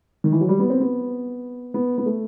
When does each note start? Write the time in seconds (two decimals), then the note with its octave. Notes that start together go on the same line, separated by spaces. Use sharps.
0.24 D#3
0.32 E3
0.41 F#3
0.49 G3
0.59 B3
0.70 C4
0.80 B3
1.74 B3
1.98 B3
2.06 A3